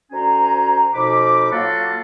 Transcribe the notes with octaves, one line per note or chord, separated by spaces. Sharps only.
D2 C#4 F#4 C5 G#5 A#5
F2 B2 D#4 B5 D6
F#3 A#3 F4 F#4 A4 F5